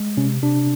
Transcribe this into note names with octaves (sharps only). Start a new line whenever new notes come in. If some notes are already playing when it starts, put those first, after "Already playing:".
Already playing: G#3
C3 C#4
C3 D4